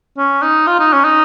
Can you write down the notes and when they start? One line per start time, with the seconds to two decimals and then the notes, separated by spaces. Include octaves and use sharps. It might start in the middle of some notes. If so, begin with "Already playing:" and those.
0.18 C#4
0.42 D#4
0.67 F4
0.79 D#4
0.93 C#4
1.05 D#4